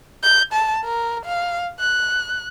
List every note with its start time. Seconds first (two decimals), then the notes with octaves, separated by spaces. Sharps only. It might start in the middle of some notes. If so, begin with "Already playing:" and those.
0.23 G6
0.53 A5
0.85 A#4
1.26 F5
1.80 F#6